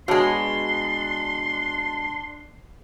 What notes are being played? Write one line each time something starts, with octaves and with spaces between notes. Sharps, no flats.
B2 G#3 D4 F#4 C#5 A5 C6